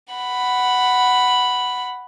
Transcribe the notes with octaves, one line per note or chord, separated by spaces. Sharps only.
F#5 B5